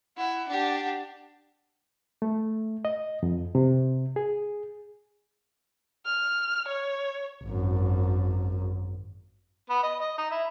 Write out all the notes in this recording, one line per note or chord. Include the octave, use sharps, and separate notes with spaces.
E4 F#5
D4 G4
A3
D#5
F2
C3
G#4
F6
C#5
G#1 F#2
B3
D#5
D#5
D#4
E4